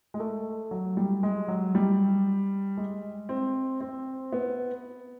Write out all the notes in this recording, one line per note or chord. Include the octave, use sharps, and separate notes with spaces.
G#3
A3
F#3
G3
G#3
F#3
G3
G#3
C4
C4
B3